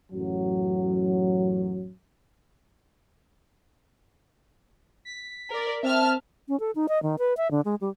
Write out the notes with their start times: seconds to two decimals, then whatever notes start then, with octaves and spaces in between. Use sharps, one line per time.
0.12 A1 F#2 F#3
5.05 B6
5.51 A#4 D5
5.83 C4 E5 A5 F6
6.48 C#4
6.60 A4
6.75 D#4
6.89 D#5
7.03 D#3
7.19 B4
7.37 E5
7.51 D3
7.65 G#3
7.81 G3